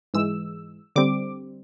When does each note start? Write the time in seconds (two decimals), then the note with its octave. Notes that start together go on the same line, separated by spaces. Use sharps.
0.14 G#2 E3 G#3 E6
0.96 D3 G3 C4 D6